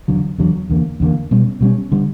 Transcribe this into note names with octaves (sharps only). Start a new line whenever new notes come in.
E2 D3 F#3
E2 D3 F#3
E2 D3 A#3
E2 D3 A#3
B2 G3 C#4
B2 G3 C#4
D3 G3